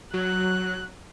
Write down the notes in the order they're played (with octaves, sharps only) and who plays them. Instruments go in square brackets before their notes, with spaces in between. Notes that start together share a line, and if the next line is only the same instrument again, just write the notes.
[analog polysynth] F#3 [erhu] F#6